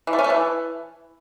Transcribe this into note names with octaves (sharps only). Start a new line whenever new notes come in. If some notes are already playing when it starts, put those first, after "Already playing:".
E3
A3
C#4
A3
E3